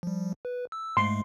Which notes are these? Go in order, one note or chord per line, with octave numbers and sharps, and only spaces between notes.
F3 G3
B4
E6
G#2 G#3 A3 C6